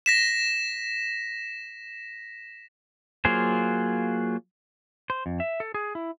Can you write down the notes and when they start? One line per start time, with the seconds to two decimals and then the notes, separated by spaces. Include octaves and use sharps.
0.06 A#6 B6 E7
3.25 F#3 A#3 F4 G#4 C5
5.10 C5
5.26 F2
5.40 E5
5.60 A4
5.74 G#4
5.95 E4